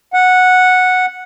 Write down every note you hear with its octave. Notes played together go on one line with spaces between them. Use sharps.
F#5